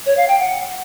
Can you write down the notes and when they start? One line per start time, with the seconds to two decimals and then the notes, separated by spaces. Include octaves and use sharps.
0.06 C#5
0.17 F5
0.28 G5
0.39 F#5